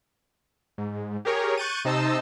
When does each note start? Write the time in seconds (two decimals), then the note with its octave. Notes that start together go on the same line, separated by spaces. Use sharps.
0.78 G#2
1.25 G4 G#4 A#4 C#5
1.57 C#6 F#6 G6 A6 D#7
1.85 C3 D#4 C5 D#5 A5 E6